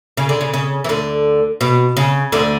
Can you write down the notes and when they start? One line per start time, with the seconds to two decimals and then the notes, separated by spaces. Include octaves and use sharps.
0.17 C#3
0.29 D3
0.41 C#3
0.53 C#3
0.84 E3
0.89 D2 D3
1.61 B2
1.97 C#3
2.32 D2 D3